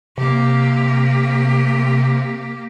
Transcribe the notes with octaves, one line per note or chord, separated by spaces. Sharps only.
C3 A#3 G4